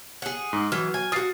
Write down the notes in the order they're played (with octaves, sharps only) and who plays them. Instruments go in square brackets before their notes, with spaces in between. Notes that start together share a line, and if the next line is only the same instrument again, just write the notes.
[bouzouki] G#4 F#5
[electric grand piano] G#2
[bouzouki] E3 [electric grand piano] F#3 F6
[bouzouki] G#5
[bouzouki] F4 F#4 [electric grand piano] D#6 A6 C7